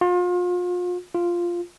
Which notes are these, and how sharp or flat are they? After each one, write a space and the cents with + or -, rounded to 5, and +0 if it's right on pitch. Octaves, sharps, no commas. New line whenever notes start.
F4 +35
F4 -5